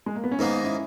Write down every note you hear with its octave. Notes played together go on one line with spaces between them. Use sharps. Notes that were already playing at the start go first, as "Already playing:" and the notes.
G#3
A#3
B3
C#4
G#2 D#3 A#3 B3 D#4
C#4 E4